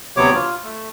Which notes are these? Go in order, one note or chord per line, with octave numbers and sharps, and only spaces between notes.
D2 C3 F#3 B3 C#5 D6
F4
A3